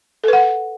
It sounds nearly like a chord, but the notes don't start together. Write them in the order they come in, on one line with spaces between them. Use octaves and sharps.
A4 B4 F#5